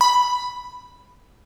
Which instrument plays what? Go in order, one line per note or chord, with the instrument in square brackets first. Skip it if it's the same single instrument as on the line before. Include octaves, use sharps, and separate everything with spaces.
[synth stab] B5